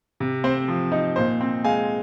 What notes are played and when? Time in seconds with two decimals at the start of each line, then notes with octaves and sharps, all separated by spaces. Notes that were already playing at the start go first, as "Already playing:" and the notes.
0.20 C3
0.44 C4 C5
0.68 F3
0.92 D#4
1.16 A#2 C5
1.41 C4
1.64 G#3 F5 G#5